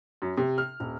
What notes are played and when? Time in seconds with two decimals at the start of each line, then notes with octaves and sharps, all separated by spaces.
0.22 F#2
0.38 C3
0.58 F6
0.80 D#1